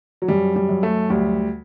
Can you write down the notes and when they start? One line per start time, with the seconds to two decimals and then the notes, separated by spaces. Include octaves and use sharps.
0.22 F#3
0.28 F#2 G3
0.56 G3
0.69 F#2
0.83 A3
1.10 D2 G3